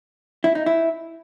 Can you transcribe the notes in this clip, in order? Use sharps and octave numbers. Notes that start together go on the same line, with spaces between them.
E4
D#4
E4